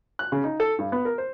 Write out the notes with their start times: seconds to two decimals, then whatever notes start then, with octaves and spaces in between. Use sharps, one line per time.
0.19 F#6
0.32 C#3
0.44 D#4
0.60 A4
0.79 G2
0.92 B3
1.05 A#4
1.18 C5